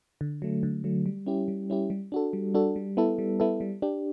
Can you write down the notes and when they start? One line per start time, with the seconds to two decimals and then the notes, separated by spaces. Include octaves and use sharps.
0.21 D3
0.42 F#3 A3
0.63 D3
0.84 F#3 A3
1.06 G3
1.26 C#4 E4 G4
1.48 G3
1.70 C#4 E4 G4
1.90 G3
2.12 D4 F#4 A4
2.33 G3
2.54 D4 F#4 A4
2.76 G3
2.97 B3 E4 A4
3.19 G3
3.40 B3 E4 A4
3.60 G3
3.82 D4 G4